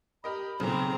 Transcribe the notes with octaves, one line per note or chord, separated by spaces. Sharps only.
G4 A#4 D#5 B5
B1 A#2 C#3 C4 A#5